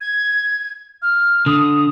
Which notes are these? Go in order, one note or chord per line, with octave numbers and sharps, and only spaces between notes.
G#6
F6
D3 D#6